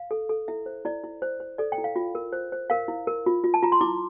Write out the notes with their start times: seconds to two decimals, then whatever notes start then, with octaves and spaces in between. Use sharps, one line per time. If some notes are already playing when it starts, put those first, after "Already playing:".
Already playing: F5
0.11 A4
0.29 A4
0.48 E4 E5
0.66 C5
0.85 E4 D5
1.04 E4
1.22 C5
1.40 C5
1.58 A4 D5
1.72 G5
1.78 E4
1.84 F5
1.96 F4
2.15 A#4
2.33 C5
2.52 C5
2.70 A#4 F5
2.88 E4
3.07 A#4
3.26 F4
3.44 F4
3.54 A5
3.63 F4 A#5
3.72 C6
3.81 E4 D6